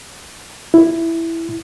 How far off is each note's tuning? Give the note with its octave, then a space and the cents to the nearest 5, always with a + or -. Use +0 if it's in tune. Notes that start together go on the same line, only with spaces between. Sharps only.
E4 +5